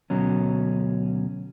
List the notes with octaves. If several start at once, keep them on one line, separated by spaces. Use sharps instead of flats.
D2 B2 F#3 C#4